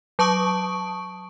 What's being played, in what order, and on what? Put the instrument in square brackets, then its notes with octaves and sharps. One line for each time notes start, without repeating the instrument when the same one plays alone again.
[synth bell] F#3 A5 C#6 D#6 D7